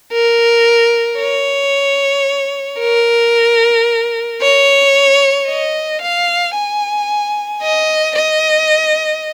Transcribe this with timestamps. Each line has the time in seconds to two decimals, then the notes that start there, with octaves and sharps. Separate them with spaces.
0.12 A#4
1.19 C#5
2.79 A#4
4.41 C#5
5.48 D#5
6.02 F5
6.55 G#5
7.62 D#5
8.16 D#5